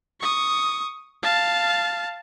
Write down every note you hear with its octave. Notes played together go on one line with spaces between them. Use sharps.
C#6 D#6
F5 A5